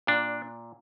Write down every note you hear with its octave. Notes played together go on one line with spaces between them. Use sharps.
A#2 D4